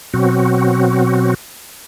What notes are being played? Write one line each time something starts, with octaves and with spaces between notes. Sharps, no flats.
B2 F#3 C4 F#4